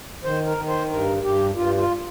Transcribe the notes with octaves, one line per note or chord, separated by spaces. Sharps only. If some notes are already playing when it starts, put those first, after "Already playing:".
D#3 C5
A#4
D#3
C5
G2 A#4
G2 G4
G2 F4
F4